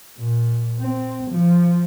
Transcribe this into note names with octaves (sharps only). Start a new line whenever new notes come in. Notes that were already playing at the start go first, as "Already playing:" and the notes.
A#2
C4
F3